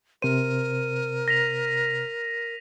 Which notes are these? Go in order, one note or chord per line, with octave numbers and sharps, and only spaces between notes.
C3 A#4 C5 D#7
A#6 B6 F7